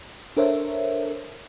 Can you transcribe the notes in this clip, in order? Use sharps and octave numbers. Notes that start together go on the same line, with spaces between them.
D4 A4 A#4 C5 C#5 E5